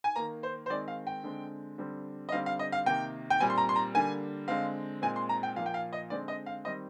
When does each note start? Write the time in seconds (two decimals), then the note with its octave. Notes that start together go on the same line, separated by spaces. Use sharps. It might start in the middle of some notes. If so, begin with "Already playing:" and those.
0.04 G#5
0.16 D#3 A#3 A#5
0.43 C5
0.66 C5
0.70 D#3 G#3 C4 D5
0.88 F5
1.07 G5
1.24 D3 G#3 C4
1.78 D3 G3 C4
2.29 D#5
2.32 D3 G3 C4 F5
2.46 F5
2.59 D#5
2.72 F5
2.86 C3 D#3 A#3 G5
3.30 G5
3.40 A#2 G3 C4 G#5
3.50 C6
3.58 A#5
3.69 C6
3.76 A#5
3.94 D3 G3 A#3 G#5
4.48 D3 G#3 C4 F5
5.02 A#2 G#3 C4 G#5
5.16 C6
5.29 A#5
5.43 G5
5.56 A#2 F3 A#3 F5
5.66 G5
5.74 F5
5.93 D#5
6.10 D3 G#3 C4 D5
6.28 D#5
6.46 F5
6.65 D#3 G3 C4 D#5